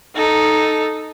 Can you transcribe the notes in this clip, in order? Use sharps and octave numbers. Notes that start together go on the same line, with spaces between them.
D#4 A4